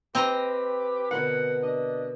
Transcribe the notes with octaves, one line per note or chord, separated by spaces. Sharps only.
C4 G4 B4 D#5 A#5
B2 D3 A#4 F#5
D4 D#5